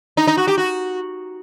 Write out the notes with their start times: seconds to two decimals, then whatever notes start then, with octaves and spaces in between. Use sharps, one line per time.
0.17 D#4
0.27 D#4
0.37 F#4
0.47 G4
0.58 F#4